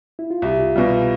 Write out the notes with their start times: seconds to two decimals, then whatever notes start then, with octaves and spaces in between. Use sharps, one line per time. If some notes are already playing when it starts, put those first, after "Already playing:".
0.19 E4
0.31 F4
0.42 C2 F#4
0.59 F4
0.76 B2 G3 F4
0.92 F4